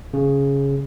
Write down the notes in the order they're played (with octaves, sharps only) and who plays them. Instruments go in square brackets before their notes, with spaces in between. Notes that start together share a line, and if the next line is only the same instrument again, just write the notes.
[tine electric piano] C#3